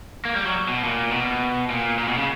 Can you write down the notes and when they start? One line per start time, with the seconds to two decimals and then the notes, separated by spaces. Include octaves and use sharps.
0.25 A#3
0.36 G3
0.45 F#3
0.68 B2
0.84 A#2
1.12 B2
1.70 A#2
1.98 A#2
2.08 B2
2.18 C#3